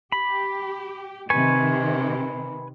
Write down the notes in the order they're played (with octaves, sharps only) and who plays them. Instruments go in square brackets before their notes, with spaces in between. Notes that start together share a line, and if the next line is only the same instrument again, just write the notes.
[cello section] G4 [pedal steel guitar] B5
[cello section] C3 D#3 [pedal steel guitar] B4 G#5 C#6